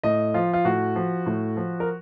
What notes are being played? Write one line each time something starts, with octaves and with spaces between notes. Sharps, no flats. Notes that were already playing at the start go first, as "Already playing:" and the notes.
A2 D#5
F3 F4
F4
A2 F#4
F3
A2
F3
A#4